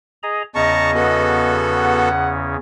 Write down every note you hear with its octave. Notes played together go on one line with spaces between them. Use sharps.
G#4 D#5 A#5
E2 C#3 C#4 D#5 A5 A#5 C#6
B3 F#4 A4
F#5